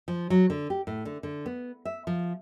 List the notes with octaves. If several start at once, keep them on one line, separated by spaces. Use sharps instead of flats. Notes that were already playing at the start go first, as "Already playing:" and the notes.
F3
F#3
D3
G4
A2
D3
D3
B3
E5
F3